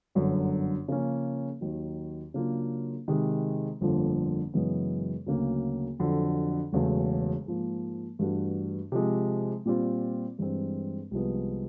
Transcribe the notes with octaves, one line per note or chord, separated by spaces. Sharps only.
G1 F#2 D3 F#3
C#3 F3 A#3 C#4
D#2 D#3 F#3
C#3 F#3 A#3 D4 F4
C3 D#3 G#3
G1 F2 D3 F3 A#3
F#2 C#3 E3 G#3 B3
D2 C#3 F#3 A#3 C#4
F2 D3 F#3
E1 E2 C#3 F#3 A3
G#2 F3 A#3
G2 E3 A3 D4 F#4
C3 F3 G#3
A#2 G3 C4 F4
G2 E3 G#3 C4
C2 C3 F3 G#3 B3